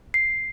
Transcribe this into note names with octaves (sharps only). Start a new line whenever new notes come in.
C7